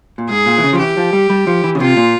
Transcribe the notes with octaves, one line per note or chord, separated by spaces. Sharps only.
A#2
G#2 G#4
A#2
E3
C#3
F3
E3 G4
F3
G3
G3
F3
E3
C#3
C3 F4
A#2